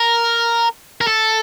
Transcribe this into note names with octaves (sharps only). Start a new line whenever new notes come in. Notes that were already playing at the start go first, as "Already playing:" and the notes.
Already playing: A#4
A#4
A4